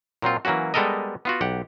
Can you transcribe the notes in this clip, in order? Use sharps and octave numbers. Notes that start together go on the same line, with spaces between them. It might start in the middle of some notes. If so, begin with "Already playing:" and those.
A#2 F#3 C4 F4
E3 F#3 A#3 C#4 F#4
G3 G#3 B3 A4 A#4 D#5
B3 F4 F#4
B1 G4 F#5